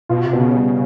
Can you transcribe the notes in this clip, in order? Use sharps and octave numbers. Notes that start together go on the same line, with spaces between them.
B2 F4
C3
B2
C#3
G3